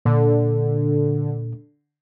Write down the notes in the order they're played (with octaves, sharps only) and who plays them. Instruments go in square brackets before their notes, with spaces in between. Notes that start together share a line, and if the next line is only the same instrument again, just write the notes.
[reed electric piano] A#2 [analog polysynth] D3